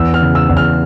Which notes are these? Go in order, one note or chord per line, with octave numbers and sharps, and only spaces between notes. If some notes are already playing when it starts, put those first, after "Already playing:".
Already playing: E2 E6
F6
C#3
E6
E2
F6